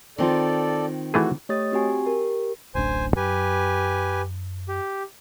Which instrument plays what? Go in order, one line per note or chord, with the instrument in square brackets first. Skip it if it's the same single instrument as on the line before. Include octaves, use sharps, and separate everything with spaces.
[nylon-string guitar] D#3 C4 F4 [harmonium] A4 D5
[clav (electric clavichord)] E3 A3 G#4 [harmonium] F#4
[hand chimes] A3 G4 C#5 D#5 D#6 A6
C4 F#4 G4 G#5
G4 A#4
[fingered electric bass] D1 A1 D4 [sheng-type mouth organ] C5 G#5
[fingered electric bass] F#2 [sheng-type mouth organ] G4 B4 G#5
[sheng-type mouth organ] G4